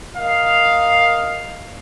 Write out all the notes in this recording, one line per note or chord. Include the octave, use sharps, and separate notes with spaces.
A#4 D#5 F5